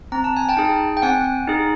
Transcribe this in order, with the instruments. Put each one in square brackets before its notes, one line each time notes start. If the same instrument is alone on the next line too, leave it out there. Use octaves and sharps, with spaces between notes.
[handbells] C4 A#5
A5
G#5
G5 A5
D#4 G#4
G5
C4 F#5 G#5
D#4 G#4